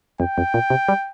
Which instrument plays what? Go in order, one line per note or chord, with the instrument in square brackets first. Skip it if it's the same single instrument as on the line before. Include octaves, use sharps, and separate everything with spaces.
[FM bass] F2 [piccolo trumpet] G5
[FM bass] F2
A#2
C3
G3